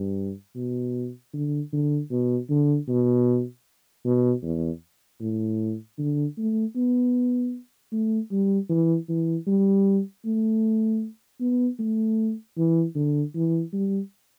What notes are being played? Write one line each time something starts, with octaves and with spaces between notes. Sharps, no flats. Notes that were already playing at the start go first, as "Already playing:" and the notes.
Already playing: G2
B2
D3
D3
B2
D3
B2
B2
E2
A2
D3
A3
B3
A3
G3
E3
E3
G3
A3
B3
A3
E3
D3
E3
G3